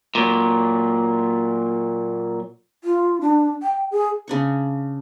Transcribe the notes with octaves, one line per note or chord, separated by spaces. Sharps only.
A#2 F#3
F4
D4
G5
G#4
C#3 D4 C#6